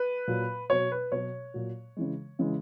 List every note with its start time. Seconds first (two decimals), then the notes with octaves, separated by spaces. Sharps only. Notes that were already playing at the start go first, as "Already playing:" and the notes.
Already playing: B4
0.28 A#2 F#3
0.70 B2 F#3 C#5
0.92 B4
1.12 B2 F#3 C#5
1.54 A#2 F#3
1.97 C#3 E3 G#3
2.39 C#3 E3 G#3